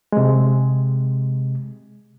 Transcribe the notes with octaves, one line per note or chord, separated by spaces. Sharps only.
C3 G#3